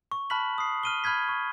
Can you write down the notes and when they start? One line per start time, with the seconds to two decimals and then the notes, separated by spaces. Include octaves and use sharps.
0.12 C#6
0.30 A5 B5 F6 F#6 B6 F#7
0.58 D#6 C7
0.83 F6 D#7 G7
1.04 B5 F6 G6 G#6 B6
1.29 C#6